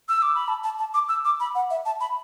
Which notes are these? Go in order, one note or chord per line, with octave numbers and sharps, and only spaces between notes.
E6
D6
B5
A5
A5
A5
D6
E6
D6
B5
F#5
E5
A5
B5